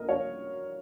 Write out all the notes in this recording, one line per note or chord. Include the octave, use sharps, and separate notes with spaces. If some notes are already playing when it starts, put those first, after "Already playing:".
Already playing: A#1 A#2 A#4 D#5
C#5 F5